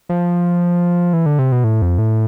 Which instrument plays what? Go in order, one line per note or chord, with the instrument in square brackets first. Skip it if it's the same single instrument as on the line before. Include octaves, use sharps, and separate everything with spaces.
[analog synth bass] F3
E3
D3
C3
B2
A2
F2
A2